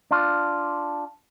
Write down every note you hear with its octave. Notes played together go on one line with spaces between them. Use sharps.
D4 F4